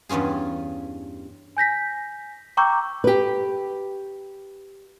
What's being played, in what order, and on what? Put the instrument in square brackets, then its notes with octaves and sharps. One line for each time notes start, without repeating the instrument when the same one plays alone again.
[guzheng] E2 G2 C#4 F4 G#4
[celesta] G#5 G6 A#6 B6
G5 A#5 C#6 D6 E6 G6
[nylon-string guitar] G4 B4